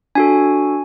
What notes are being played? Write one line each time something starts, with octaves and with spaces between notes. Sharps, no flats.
D4 F#4 A4 G#5